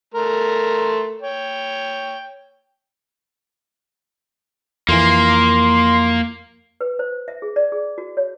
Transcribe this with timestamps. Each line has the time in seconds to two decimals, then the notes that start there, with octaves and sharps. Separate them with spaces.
0.14 A3 A#4 C6
1.22 C#5 G5
4.89 F2 E3 A#3 C6
6.81 B4
6.99 C5
7.28 E5
7.42 G#4
7.56 D5
7.72 G#4
7.98 F#4
8.17 C#5